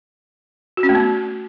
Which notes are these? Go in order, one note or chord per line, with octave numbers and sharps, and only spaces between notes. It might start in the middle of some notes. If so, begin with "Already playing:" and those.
F#4
C#4
A3
B3